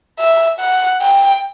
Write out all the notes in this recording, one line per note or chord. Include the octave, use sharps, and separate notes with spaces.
E5
F#5
G5